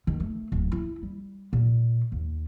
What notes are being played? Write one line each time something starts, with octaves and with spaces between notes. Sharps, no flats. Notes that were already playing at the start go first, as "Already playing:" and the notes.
D#3
A3
D1
E4
G3
A#2
D#2